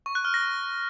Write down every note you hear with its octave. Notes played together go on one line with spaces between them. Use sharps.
C#6
F#6
F6
A#6